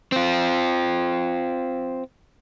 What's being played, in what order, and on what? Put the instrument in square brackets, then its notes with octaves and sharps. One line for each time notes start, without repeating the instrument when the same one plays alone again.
[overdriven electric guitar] C4 F4